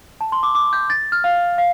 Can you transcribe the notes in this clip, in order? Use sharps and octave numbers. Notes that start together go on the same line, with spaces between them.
A5
C6
D6
D6
G6
A6
F6
F5
F5